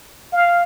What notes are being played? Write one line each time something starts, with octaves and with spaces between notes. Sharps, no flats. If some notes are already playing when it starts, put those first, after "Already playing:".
F5